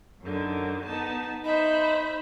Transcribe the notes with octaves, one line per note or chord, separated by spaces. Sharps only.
F#2 D3 D#3
B3 D#4 A5
D#4 C5 E5 B5